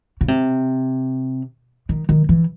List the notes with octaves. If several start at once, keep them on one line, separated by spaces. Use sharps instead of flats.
C#3
C3
D#3
D#3
E3